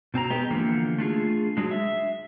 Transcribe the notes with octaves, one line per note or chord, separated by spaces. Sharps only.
B2 C4 A5 A#5
G#3 B3 G4 D#5
D3 E3 F3 A#3
A3 D4 F4 G#4
F#3 G#3 D4
E5